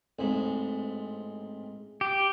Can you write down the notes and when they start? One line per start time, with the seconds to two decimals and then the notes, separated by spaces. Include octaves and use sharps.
0.19 A1 G#2 C4
2.01 G4